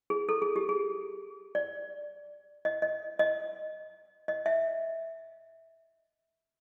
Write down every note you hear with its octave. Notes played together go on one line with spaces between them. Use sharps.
G#4
A4
G#4
G4
G#4
D5
D#5
D#5
D#5
D#5
E5